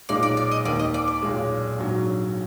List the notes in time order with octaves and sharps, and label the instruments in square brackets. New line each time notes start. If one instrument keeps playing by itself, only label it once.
[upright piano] B1 A#2 G#3 D#4 [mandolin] D5
[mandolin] D5
D5
D#5
[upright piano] D#2 D#3 A#3 [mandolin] D5
[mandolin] D#5
D5
D5
[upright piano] B1 A#2 G#3
A#1 G#2 F#3